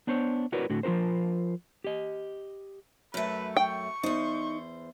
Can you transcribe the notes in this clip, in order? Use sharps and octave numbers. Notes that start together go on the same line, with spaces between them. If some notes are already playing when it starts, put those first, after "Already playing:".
B3 D4 C5 C#5
E4 F#4 A#4 B4 C#5 D5
A2 D3 F#4
F3 F4 F#4 A#4 C5
G4 D#5
F#2 A3 B4
G5 C#6
E2 D#4 C5